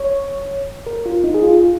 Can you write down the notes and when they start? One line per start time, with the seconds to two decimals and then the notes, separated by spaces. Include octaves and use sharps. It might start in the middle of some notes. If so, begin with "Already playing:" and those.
Already playing: C#5
0.86 A#4
1.06 F4
1.24 D#4
1.34 G#4
1.43 F4